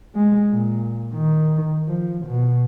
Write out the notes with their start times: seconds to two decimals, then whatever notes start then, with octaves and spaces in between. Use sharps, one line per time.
0.15 G#3
0.51 A#2
1.14 D#3
1.88 F3
2.27 B2